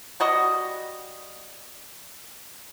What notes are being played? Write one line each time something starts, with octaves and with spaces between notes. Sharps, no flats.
G3 F#4 D#5